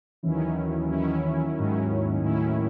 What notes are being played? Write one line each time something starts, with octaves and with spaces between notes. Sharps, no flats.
D#2 D#3 E3 F#3 C#4 E4
D#2 D#3 F#3 C#4 E4
D#2 G#2 D#3 F#3 C#4 E4
G#2
D#2 A2 D#3 F#3 C#4 E4